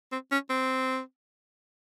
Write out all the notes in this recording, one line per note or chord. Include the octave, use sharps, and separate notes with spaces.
C4
C#4
C4